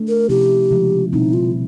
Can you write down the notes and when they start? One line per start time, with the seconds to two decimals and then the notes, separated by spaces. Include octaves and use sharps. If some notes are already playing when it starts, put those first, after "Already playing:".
Already playing: A3 D4
0.08 A#4
0.29 C3 F3 A3 C#4 E4 G4
0.71 C#3 F3 G#3
1.12 B2 G3 C4 D#4 E4
1.33 F4